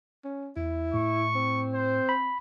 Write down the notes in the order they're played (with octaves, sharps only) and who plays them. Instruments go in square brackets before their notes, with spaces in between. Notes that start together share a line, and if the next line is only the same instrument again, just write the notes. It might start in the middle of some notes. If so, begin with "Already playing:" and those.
[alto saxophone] C#4
[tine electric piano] E2 [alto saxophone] E4
[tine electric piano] A2 [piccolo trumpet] C#6
[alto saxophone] C4
[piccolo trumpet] C5
[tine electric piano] B5